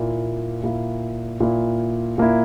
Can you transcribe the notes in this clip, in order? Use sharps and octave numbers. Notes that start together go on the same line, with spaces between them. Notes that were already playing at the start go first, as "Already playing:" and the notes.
Already playing: A#2 A#3 E4
A#2 A#3 E4
A#2 A#3 E4
A#2 A#3 E4